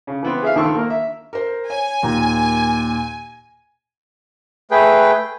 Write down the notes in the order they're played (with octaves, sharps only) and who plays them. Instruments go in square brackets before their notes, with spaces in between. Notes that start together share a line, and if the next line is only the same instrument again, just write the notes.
[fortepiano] C#3
E3 B3 C4
G#4 E5 F5
A#1 D#3 A4 C5 C#6 E6
A#3 A#4
E5
[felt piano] A#4 C5
[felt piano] C#5 [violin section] G#5
[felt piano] D#2 A#2 A#5
[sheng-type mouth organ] A3 G#4 B4 G5